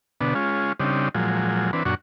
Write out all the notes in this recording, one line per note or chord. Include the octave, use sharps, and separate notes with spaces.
B2 D3 B3 D4
G#3 C#4 F4
C#3 G3 C4 D4 D#4
A#2 F3 F#3 G#3
E3 C4 D4 B4
F#2 A#2 D4 F#4 C#6